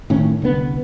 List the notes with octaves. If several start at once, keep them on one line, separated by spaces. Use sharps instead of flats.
A2 D#3 C#4
C2 D3 F3 B3